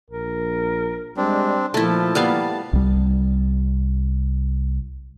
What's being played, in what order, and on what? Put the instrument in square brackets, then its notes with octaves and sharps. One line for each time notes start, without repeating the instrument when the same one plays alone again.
[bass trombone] A#1 [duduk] A#4
[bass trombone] G3 [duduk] G#3 [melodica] C4 D4
[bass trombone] A#2 [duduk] F3 [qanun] A3 E4 [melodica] A5
[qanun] G3 B3 F5 [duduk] A#3
[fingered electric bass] C2 G3